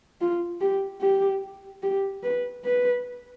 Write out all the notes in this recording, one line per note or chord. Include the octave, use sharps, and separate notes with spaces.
F4
G4
G4
G4
B4
B4